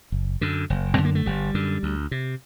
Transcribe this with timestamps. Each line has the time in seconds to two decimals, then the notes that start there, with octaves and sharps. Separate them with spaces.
0.12 F#1
0.41 F#2 D3
0.70 F#1
0.94 F#2 D3 C4
1.05 A#3
1.15 A3
1.26 G1 G3
1.54 F#2 D3
1.83 D2
2.11 C3